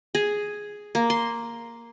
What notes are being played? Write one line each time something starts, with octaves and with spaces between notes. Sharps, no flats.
G#4
A#3
C6